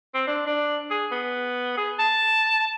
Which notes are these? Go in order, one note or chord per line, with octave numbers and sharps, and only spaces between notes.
C4
D4
D4
G#4
B3
G#4
A5